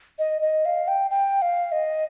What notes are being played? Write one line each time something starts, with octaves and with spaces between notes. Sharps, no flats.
D#5
D#5
F5
G5
G5
F5
D#5